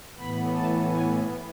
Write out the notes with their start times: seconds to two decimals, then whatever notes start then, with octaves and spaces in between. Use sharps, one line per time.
0.17 A2 E3 B3 B5
0.55 A5
0.90 G#5